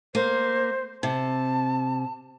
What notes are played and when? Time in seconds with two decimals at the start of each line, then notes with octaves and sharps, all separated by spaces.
0.15 A#3 C5
1.03 C3 A5